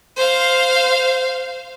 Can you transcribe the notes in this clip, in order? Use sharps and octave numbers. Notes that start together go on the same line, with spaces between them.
C5 F5